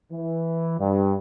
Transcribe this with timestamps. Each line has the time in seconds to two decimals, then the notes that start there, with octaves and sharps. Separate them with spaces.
0.11 E3
0.80 G2